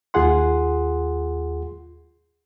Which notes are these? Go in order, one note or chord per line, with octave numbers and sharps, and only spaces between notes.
D#2 F4 G#4 F#5 C6